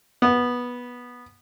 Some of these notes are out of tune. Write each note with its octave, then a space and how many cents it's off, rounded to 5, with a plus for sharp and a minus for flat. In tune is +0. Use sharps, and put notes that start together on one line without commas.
B3 -10